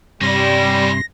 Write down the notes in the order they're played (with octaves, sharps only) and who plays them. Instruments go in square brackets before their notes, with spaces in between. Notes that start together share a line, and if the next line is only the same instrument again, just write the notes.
[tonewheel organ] G2 C3 C6 [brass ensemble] G3 [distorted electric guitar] C#4 E4 [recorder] A#6